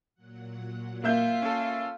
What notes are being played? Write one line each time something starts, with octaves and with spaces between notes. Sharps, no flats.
A#2 F#3 F#5
A#3 F4 E5 G6
C#4 A4